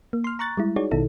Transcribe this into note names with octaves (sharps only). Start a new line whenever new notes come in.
A#3
C6 F6
A#5 C#6 F#6 A6
G3 G#3 E4
D#4 F#4 G#4 C#5 D5
A#1 B2 D#3 D#4 E4 A4